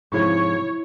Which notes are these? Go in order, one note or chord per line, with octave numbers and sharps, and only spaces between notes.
G#2 C3 F3 E4 C#5 C#6